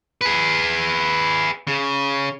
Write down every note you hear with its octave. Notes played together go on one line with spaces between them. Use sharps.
G#4 B4
C#3